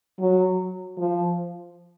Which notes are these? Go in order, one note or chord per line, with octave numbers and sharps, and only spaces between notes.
F#3
F3